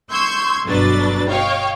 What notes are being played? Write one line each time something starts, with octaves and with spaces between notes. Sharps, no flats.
C6 C#6 E6 G6 G#6
G1 B2 F#3 D4 B4 A6
C#5 D#5 F5 G5